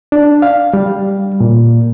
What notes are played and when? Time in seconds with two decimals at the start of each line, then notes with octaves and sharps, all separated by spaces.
0.12 D4
0.42 F5
0.73 G3
1.40 A#2